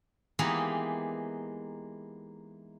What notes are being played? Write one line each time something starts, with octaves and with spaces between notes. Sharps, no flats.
E3 G#3 A#3 B3 D#4 G4